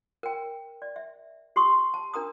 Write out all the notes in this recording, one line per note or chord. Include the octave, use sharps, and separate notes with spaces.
A#4 G5
D5
E5
G4 C6 C#6 D#6
A5
D4 A#4 A#5 D#6